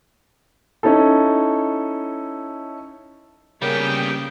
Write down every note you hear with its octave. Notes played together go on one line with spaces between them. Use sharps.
C#4 D#4 E4 A4
C#3 G3 A#3 B3 C#4 A#4 G5